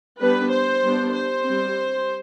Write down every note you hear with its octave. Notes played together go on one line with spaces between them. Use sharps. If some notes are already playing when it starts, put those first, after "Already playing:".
G3 B3 D4 B4
C5
G3 B3 D4
C5
G3 C4